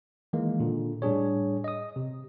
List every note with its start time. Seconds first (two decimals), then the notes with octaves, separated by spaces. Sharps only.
0.33 D#3 E3 G#3 A#3
0.60 A#2 D3
1.02 A2 G3 D4 G#4 C#5
1.64 D#5 D#6
1.96 C3